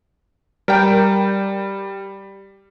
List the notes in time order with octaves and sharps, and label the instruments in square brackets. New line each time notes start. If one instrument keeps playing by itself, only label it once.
[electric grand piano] G3 [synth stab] A#4 G5